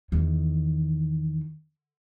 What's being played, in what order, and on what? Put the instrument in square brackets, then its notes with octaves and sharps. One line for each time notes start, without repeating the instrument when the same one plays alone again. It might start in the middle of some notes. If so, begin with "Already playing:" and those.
[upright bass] E2 D#3